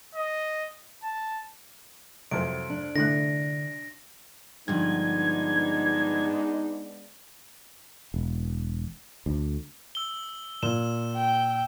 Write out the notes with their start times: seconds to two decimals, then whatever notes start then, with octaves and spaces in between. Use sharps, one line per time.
0.15 D#5
1.04 A5
2.31 C2 F2 F#3 C4 D7
2.70 D4
2.96 C2 A2 D3 F#6 A#6
4.68 G2 D3 F3 G#3 B3 D4 D#4 G#6
8.14 E1
9.26 D2
9.95 E6 G7
10.63 A#2 E7 G7
11.16 G5